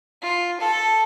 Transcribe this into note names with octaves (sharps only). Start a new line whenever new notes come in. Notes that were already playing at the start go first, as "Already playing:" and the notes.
F4
A4